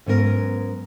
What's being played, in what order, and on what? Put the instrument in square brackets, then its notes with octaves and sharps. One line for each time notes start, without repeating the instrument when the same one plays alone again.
[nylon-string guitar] G#2 F#3 B3 C#4 E4 A#4